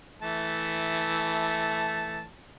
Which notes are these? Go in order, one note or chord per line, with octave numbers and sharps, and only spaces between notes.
E3 A3 A5